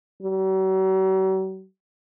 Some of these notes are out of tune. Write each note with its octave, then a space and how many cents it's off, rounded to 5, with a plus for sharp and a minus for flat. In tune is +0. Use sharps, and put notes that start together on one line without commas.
F#3 +45